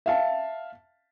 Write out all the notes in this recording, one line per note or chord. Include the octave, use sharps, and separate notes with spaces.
E5 F5 A5